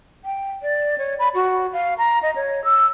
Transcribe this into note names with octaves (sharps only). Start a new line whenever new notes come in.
G5
D5
C#5
B5
F#4
F5
A#5
D#5
C#5
E6